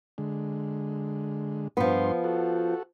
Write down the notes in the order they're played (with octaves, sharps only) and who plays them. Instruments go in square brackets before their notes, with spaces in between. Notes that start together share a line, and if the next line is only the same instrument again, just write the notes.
[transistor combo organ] D3 G#3
[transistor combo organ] G2 D4 C6 [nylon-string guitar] F3 B3
[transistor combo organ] F#4 A4